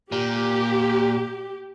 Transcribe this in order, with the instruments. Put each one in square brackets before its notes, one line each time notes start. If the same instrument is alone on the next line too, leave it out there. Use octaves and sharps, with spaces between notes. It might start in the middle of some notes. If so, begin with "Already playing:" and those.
[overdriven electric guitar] A#2 [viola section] G4